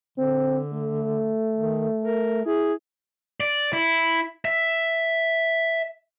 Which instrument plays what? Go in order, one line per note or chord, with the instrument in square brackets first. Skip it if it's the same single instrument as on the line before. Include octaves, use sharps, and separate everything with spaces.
[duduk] D3 [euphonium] C4
[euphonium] A3
[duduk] D#3
A#4
[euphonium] E4 [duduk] G#4
[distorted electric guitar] D5
E4
E5